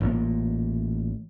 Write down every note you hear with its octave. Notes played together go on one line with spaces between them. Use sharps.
A1 A#2